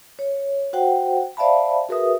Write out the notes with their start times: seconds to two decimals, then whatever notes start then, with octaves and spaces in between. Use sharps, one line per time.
0.19 C#5
0.73 F#4 C5 F#5 G5
1.37 C5 D5 E5 F5 A5 B5
1.89 F#4 G#4 A#4 B4 E5 D#6